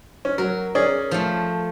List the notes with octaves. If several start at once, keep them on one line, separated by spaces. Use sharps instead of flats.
C#4
F#3 A#4
C#4 G#4 D5
F3 A3